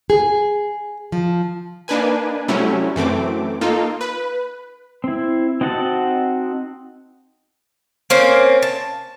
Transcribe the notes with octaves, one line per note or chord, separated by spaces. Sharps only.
G#4
F3
A#3 D4 D#4 B4 G#5
C3 F#3 G3 A3 C#4 E4
F#2 E3 A3 C4 D6
A#3 D#4 F4 A4
B4
C4 E4
C4 D#4 F#4 F#5 A5
A#3 C4 C#4
A5